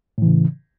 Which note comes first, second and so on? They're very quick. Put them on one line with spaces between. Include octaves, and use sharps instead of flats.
A2 E3 C#3